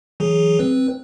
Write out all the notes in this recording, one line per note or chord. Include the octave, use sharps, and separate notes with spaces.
E3 F#3 G#4
C4 B4